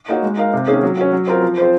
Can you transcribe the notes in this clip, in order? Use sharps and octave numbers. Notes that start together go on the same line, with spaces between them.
A#3 D#4 F#4 C#5
G#3
D#4 A#4 F5
C3
D#3 A#3 C#4 G#4
F#3
C#4 F#4
F#3
C4 F4 A#4
F3
C4 F4 C5